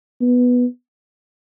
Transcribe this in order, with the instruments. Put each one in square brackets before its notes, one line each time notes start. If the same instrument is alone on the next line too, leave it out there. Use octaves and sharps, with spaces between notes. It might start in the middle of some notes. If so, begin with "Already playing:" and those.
[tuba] B3